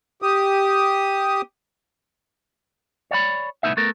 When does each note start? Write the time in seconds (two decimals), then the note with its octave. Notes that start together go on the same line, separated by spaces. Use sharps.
0.22 G4 D#6
3.11 C#5 D5 F5 B5
3.63 C2 A2 A#3 B3 D#4 E5
3.77 A3 B3 A4 A#4